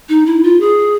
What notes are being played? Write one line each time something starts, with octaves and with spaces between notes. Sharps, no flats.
D#4
E4
F4
G#4